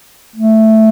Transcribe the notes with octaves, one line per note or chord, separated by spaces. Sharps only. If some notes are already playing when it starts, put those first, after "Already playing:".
A3